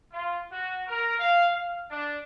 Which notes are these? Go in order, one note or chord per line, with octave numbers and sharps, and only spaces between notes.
F4
F#4
A#4
F5
F5
D4